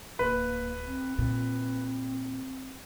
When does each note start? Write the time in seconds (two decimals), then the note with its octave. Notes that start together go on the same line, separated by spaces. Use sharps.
0.19 D1 A#3 B4 B5
0.86 C4
1.18 A#2 C4